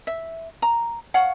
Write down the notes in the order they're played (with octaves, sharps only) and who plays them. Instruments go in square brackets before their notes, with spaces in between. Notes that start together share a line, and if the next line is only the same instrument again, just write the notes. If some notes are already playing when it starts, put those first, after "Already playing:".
[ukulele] E5
A#5
C#5 F5 F#5